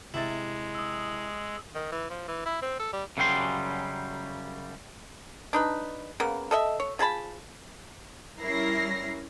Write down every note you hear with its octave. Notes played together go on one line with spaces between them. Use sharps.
C3 G#3 E4 E5 A6
D#6 E6
D#3
E3
F3
E3
E4
C4
A4
G3
F#2 C#3 F#3 G3 G5 C6
D4 D#4 B4
C#3 A#3 B3
A4 D#5 E5
C#5
F3 G#4 A5 B5
G3 C#4 E4 A#4 A#6 C7